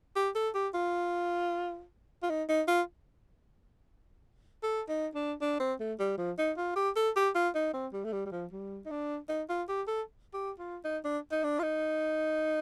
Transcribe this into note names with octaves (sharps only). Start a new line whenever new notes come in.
G4
A4
G4
F4
F4
D#4
D#4
F4
A4
D#4
D4
D4
C4
A3
G3
F3
D#4
F4
G4
A4
G4
F4
D#4
C4
G3
A3
G3
G3
F3
G3
D#4
D4
D#4
F4
G4
A4
G4
F4
D#4
D4
D#4
D4
F4
D#4